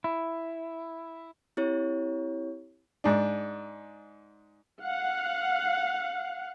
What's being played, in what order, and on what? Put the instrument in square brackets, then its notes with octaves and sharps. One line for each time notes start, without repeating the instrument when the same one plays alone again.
[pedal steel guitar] E4
[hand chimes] C4 E4 G4 C#5
[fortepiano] G#2 D4
[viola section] F5 F#5